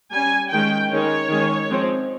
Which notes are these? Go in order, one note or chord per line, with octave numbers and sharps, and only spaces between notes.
G3 C#4 G#5
D#3 G#3 C#4 G5
D#3 G#3 C#4 C#5
D#3 G#3 C#4
F3 G#3 C4